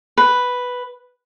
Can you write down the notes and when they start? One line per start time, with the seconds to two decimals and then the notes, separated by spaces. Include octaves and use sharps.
0.18 B4